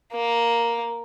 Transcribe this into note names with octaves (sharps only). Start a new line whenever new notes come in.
A#3